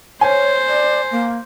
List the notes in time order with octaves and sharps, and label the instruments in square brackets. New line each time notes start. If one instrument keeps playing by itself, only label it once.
[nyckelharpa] C5 [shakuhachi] C#5 [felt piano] G#5
[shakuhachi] D5
A#3